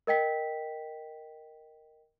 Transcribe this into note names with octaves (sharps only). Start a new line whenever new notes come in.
A#4 D#5 G5 B6